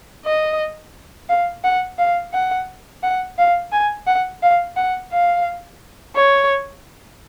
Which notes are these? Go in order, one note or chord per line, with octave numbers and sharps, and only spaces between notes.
D#5
F5
F#5
F5
F#5
F#5
F5
G#5
F#5
F5
F#5
F5
C#5